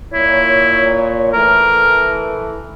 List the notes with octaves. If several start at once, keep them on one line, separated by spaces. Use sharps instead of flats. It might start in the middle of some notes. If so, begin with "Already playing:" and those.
A#2 E4 C#5
E3 A3 A#4